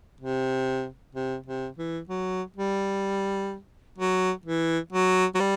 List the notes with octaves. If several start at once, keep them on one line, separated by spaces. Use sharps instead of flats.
C3
C3
C3
E3
F#3
G3
F#3
E3
F#3
F#3
G3